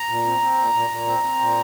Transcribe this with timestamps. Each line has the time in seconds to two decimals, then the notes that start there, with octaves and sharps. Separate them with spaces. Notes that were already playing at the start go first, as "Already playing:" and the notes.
Already playing: A#5
0.09 A#2
0.26 C4
0.41 C4
0.58 A#2
0.74 A#2
0.90 A#2
1.07 C4
1.24 C4
1.40 A#2